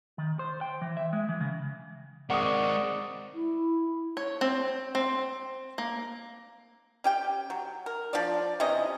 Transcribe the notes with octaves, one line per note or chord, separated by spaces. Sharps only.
D#3
C5
G5
E3
E5
G#3
E3
C#3
G#3 C4 A#4 D5 F#5 C#6 D#6
E4
C#5
C4
C4
A#3
C#4 G4 G5
F#3
A#4
F3 D4 D5
C3 E3 C#4 D#5